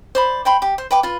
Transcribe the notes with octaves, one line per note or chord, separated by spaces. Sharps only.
C5 D5 B5
C5 G5 B5 C6
G4
C5
B4 G5 D6
F4 B4